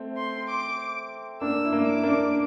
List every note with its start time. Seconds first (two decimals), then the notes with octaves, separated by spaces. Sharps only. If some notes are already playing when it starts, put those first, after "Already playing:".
Already playing: A3 C4
0.17 C6
0.49 D6
1.41 A#3 D4 E6
1.65 E4
1.72 A#3 D4
1.87 D6
1.95 E4
2.03 A#3 D4